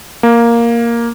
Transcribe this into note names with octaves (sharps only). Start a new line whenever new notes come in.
A#3